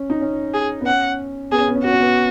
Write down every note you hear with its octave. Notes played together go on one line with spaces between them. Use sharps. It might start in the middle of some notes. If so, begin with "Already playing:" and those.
Already playing: C#4
D#4
C#4
G#4
B3
C#4 F#5
B3 G#4
C#4
B3
C#4
B3 F#4
C#4
B3